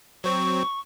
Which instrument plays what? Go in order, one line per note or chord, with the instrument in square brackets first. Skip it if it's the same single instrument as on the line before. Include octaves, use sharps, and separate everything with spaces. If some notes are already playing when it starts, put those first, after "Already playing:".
[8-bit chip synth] F#3 C4 [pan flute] C#6